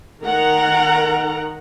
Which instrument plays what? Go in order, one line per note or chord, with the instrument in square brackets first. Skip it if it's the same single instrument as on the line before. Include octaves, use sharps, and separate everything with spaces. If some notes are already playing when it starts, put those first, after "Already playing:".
[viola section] D#3 A#4 F#5 A#5